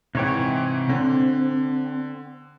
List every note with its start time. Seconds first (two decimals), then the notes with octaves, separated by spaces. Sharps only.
0.15 G#2 C3 E3 C#5 G5
0.89 D3 C4